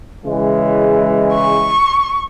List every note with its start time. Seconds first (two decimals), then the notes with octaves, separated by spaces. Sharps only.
0.25 C#3 E3 G#3
1.34 C#6